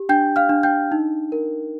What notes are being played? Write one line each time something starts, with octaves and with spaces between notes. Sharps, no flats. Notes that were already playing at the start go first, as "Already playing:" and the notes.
Already playing: G4
D4 G5 G6
F5 F6
D4
G5 G6
D#4
A#4